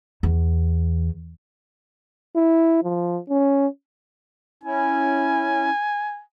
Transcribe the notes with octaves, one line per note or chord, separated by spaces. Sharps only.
E2
E4
F3
C#4
C#4 E4 G#5